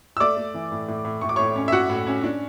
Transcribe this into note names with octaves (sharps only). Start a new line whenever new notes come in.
E6
A3 D5 D6
A3
E3
A2
A2
A2
A2 C#6
D6
C#5 C#6
A2
C#4
E5
A2 F#4 F#5
A2
C#4
D4